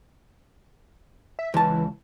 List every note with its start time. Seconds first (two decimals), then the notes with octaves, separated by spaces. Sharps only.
1.39 E5
1.54 C#2 E3 A5